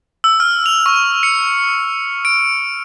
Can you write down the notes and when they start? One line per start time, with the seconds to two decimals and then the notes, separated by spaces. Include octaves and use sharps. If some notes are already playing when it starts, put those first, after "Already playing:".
0.24 E6
0.40 F6
0.66 F7
0.86 C#6
1.23 C#7
2.25 D7